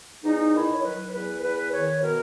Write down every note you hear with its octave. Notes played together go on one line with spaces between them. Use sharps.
E2 D#4
D#3 E4
C#5
F#3 B4
E2 B4
E2 B4
D#3 C#5
B2 A#4